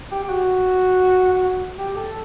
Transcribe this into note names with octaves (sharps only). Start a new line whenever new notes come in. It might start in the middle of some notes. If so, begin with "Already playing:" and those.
G4
G4
F#4
G4
A4